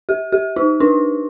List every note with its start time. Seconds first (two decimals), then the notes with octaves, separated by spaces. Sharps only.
0.09 G4
0.32 G4
0.56 D#4
0.80 D4